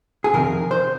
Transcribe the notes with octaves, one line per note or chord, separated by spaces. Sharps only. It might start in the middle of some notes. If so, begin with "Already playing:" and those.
G#4
F2 C3 D#3 A#4
C5